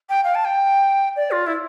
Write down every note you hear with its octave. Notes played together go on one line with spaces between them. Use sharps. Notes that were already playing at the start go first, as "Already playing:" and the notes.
G5
F5
A5
G5
D5
F4
E4